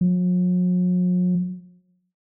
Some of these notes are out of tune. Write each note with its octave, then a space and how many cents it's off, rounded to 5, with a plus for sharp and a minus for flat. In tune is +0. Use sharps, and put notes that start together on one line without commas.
F#3 -45